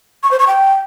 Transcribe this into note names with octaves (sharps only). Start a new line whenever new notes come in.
C#6
C5
C#6
G5